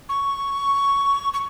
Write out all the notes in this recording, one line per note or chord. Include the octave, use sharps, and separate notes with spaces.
C#6
C#6